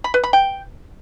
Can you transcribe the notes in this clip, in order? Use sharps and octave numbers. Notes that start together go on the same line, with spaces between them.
B5
B4
B5
G5